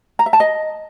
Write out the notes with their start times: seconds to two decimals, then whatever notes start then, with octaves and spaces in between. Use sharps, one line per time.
0.19 A#5
0.26 E5
0.33 A5
0.40 D#5